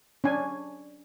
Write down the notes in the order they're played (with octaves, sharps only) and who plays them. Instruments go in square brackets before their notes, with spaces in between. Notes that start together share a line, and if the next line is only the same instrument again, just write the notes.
[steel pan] C#4 D4 G#5